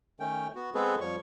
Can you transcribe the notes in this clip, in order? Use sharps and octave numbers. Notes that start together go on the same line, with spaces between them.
D#3 A3 C#4 G5
B3 F#4
G#3 B3 C4 G#4 A4 B4
F2 F3 G3 C#5 C#6